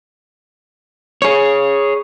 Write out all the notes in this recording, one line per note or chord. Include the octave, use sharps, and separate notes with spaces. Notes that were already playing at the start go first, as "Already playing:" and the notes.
G#4 C#5